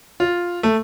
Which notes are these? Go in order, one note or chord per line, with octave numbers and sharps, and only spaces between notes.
F4
A3